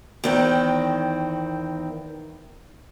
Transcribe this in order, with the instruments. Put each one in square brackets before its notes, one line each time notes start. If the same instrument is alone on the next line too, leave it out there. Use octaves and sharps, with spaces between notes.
[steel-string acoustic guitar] E2 D#3 C4